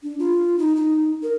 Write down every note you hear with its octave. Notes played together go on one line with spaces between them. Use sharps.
D4
F4
D#4
D#4
A#4